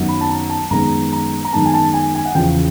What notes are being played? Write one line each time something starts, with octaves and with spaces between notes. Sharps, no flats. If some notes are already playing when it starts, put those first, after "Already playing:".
Already playing: F#2 D#3 F#3 B3
B5
A5
A#5
A5
F#2 D#3 G#3 B3 A#5
A#5
A#5
F#2 D#3 G#3 B3 A5
G#5
A5
G#5
G#5
F#5
E2 C#3 F3 G5